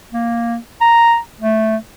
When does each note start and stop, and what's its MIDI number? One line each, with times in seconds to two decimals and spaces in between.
0.13 0.57 58
0.81 1.18 82
1.41 1.76 57